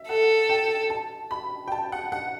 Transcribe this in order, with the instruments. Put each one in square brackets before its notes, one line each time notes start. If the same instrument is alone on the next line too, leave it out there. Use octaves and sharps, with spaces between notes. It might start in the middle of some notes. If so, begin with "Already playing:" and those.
Already playing: [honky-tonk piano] E5
[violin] A4 [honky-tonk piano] F#5
[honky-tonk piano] G5
A5
B5
G5
A5
F#5
F#5